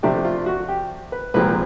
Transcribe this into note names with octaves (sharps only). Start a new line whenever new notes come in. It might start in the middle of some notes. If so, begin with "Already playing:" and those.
C3 F3 A3 D4 G4
F4
F#4
G4
B4
C2 A#2 F3 G#3 C4 B4